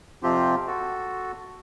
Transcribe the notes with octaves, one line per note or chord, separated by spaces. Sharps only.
F2 C3 F3 C4 F4 G4
F#4 A4